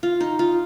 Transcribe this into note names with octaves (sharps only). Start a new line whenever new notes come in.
F4
D#4
F4